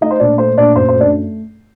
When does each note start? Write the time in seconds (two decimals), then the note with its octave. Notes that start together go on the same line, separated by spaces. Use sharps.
0.01 A3 D#4 D#5
0.11 C5
0.20 A#2 D4 D5
0.38 A3 C5
0.57 A#2 D4 D5
0.75 F#2 C5
0.88 C5
0.94 A3
1.00 D4 D5